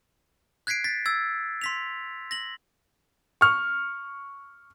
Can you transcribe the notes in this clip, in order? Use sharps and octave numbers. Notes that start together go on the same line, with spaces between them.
F#6 G#6 B6 C7 D7
A6 B6
E6 G#6 A6
C6 B6 F7
A#6 F#7
C#6 F6